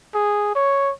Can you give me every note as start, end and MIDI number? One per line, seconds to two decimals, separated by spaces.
0.14 0.52 68
0.55 0.91 73